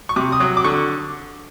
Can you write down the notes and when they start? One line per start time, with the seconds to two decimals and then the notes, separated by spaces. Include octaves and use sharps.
0.09 C#6
0.16 C3 D6
0.32 D#6
0.40 F#3
0.57 D6
0.64 D3 C#6